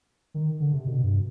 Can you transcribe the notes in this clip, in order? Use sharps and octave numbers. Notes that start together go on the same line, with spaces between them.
D#3
D3
C3
B2
G2